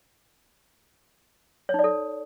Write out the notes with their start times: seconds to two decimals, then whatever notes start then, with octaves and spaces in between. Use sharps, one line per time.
1.69 C#5
1.74 D#4
1.79 D5
1.84 A4